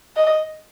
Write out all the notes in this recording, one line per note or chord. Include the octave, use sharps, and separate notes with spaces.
D#5